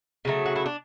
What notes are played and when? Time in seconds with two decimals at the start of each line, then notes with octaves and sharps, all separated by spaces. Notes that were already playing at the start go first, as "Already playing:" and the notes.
0.25 C#3 F#3 A3
0.46 F#4
0.56 E4
0.66 D4